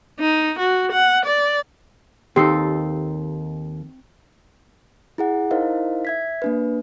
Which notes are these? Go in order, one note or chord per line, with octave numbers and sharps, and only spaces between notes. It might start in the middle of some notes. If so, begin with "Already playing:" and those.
D#4
F#4
F#5
D5
D#2 C4 D#4 G4 A4 C7
E4 G#4 F#5
D#4 E4 A#4 C5 D#5 F5
E5 G#6 B6
A#3 D4 B4